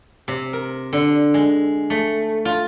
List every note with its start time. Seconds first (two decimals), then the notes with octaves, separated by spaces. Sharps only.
0.28 C3
0.53 A#4
0.93 D3
1.34 G#3
1.90 A3
2.45 F4